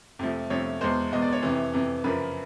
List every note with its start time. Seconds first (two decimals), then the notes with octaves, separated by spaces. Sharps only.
0.19 F2 C3 F3 A3
0.50 F2 C3 F3 A3 C#5
0.81 E2 B2 G#3 C5
1.12 E2 B2 G#3 D#5
1.22 D5
1.33 C#5
1.42 F2 C3 E3
1.74 F2 C3 E3
2.04 F#2 C#3 F3 A#3 B4